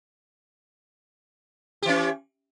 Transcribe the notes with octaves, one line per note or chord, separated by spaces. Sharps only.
E3 C#4 G4